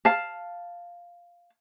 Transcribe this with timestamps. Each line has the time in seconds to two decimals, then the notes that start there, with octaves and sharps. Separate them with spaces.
0.05 F5 A5